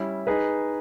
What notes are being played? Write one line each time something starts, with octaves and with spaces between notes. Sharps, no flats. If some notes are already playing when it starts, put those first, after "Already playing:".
Already playing: G3 C#4 E4
D#4 G#4 B4